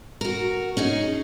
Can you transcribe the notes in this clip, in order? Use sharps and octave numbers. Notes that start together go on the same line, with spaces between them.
F#4 A#4
C#4 D#4 G#4